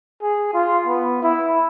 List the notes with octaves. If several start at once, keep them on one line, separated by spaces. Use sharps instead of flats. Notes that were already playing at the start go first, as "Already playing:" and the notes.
G#4
F4
B3
E4